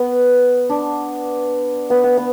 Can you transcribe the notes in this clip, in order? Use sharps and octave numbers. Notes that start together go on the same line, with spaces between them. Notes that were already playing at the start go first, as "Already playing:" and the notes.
Already playing: B3
D4
B3
B3
B3